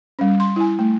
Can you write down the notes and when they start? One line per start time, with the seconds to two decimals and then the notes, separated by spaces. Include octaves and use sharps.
0.19 G3 C#4
0.40 C6
0.56 E4 G#5
0.79 A3